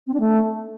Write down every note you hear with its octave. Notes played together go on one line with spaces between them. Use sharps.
C4
D4
A3